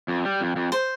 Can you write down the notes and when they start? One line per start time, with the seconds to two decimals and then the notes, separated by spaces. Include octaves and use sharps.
0.08 F2
0.25 G3
0.40 F2
0.56 F2
0.72 C5